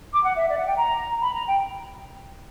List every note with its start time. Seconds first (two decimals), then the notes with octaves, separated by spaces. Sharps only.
0.11 D6
0.23 F#5
0.36 E5
0.49 D5
0.58 F#5
0.66 G5
0.76 A#5
1.22 B5
1.34 A#5
1.46 G5